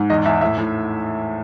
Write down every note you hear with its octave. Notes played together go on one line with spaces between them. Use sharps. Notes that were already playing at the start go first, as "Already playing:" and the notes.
Already playing: G#2
E2 D#5
E2 E5
A2 E5
A2